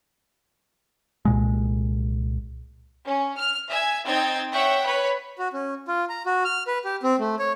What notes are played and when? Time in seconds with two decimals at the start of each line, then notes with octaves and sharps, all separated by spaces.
1.25 C2 A#2 G#3
3.06 C#4
3.38 F6
3.69 E5 G#5 G#6
4.05 C4 D#4 G5 G#6 A6
4.53 C#5 E5 F#5 G5 C#6
4.85 B4 C#5 B5
5.39 F#4
5.53 C#4
5.88 F4
6.09 A#5
6.26 F#4
6.45 F6
6.67 B4
6.85 G4
7.03 C4
7.19 A3
7.39 C#5